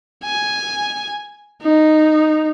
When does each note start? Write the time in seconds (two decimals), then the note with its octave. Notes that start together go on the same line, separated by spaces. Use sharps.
0.24 G#5
1.62 D#4